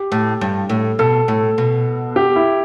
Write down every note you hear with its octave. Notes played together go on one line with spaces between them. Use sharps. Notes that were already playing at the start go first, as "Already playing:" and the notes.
Already playing: G4
A2
G2
A2
B2 A4
A2
B2
G4
E4